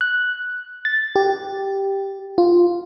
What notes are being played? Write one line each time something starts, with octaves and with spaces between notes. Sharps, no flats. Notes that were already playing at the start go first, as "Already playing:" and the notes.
F#6
A6
G4
F4